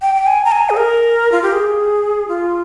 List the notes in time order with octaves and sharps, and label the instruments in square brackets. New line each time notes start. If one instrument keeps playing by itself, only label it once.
[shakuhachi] G5
G5
G#5
A#5
G#5
G#4
A#4
F4
G4
G#4
F4